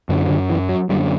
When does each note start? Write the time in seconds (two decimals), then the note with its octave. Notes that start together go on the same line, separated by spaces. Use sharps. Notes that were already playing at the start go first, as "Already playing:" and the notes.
0.09 F#2 D3 E3
0.29 D3
0.49 E3
0.69 F#3
0.89 F#2 D3 G3